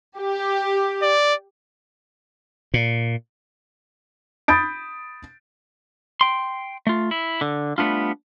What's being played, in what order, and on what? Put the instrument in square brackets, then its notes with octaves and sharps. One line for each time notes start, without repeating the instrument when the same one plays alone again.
[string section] G4
[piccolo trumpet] D5
[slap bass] A#2
[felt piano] B5 D#6 G6 A6 D7
[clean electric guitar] G5 C6
A3 F4
E4
D3
G3 A3 B3 D4 F4